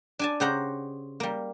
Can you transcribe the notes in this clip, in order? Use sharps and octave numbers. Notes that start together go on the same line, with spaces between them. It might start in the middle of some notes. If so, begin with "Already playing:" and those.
D4 G#5 A5
C#3 G4 C5 F#5 A#5
G3 A#3